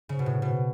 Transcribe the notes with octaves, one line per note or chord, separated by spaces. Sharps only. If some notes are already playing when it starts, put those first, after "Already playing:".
C#3
B2
A2
B2